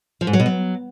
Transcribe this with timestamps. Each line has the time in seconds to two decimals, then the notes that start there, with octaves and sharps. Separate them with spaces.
0.21 F3
0.27 G#2
0.33 F#3
0.40 B2
0.46 F#3